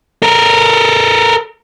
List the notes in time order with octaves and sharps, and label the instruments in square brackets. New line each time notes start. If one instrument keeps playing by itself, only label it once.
[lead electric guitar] A4 A#4